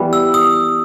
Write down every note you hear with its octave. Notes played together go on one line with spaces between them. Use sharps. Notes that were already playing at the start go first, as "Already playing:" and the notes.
Already playing: E3 G3 B3
E6
D#6